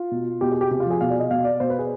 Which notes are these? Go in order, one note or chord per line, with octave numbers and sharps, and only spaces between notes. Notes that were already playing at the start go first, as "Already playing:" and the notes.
Already playing: F4
B2
B2 G4
G#4
G4
C3 G4
F4
F3 G#4
B2 F5
D5
D#5
B2 F5
D5
B2 C5
B4
G#4